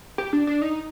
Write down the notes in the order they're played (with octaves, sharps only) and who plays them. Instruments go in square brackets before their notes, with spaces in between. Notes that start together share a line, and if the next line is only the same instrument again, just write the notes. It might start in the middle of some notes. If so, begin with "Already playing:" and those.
[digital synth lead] G4
D4
D4
D#4